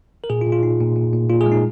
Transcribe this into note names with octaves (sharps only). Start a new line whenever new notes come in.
A#4
A#2 G#4
F4
A#2
F4
A#2 D#4
A#2
A#2
A#2
A#2 F4
G#4
G#3
D#4